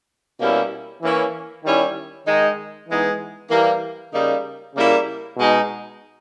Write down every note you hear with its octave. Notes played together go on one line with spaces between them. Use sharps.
B2 G3 A#3 C#4 E4
E3 A#3 C#4 E4
D#3 G3 C#4 E4
D#3 G#3 D#4
E3 G#3 B3 D#4
E3 G3 A#3
C#3 G3 A#3 D#4
C#3 G3 A#3 E4
B2 G#3 D#4